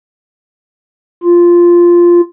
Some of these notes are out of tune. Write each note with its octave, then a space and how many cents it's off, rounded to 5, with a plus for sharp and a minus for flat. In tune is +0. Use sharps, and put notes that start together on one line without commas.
F4 -5